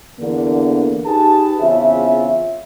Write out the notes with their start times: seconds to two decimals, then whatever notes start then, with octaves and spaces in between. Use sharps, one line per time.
0.19 E2 D3 A#3
1.06 D#4 G4 G#4 B4 A5
1.61 E2 C#3 C4 C#4 F4 E5